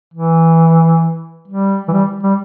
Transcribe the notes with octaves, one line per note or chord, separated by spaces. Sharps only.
E3
G3
E3
G3
G3